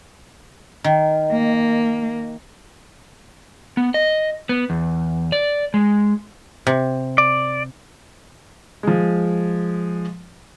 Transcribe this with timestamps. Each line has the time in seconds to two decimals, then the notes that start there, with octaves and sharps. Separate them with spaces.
0.84 D#3
1.32 A#3
3.77 B3
3.94 D#5
4.49 B3
4.70 E2
5.32 D5
5.74 G#3
6.67 C3
7.18 D5
8.83 F3 G#3